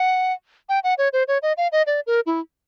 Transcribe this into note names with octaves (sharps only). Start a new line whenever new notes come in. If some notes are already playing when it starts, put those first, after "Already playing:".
Already playing: F#5
G5
F#5
C#5
C5
C#5
D#5
F5
D#5
D5
A#4
E4